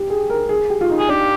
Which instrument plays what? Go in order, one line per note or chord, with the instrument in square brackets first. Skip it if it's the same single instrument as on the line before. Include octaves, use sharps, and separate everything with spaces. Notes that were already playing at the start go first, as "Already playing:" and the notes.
Already playing: [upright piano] G4
G#4
A#4
G#4
G4
F4
D#4
[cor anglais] G#4
[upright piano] D4 [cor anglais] G4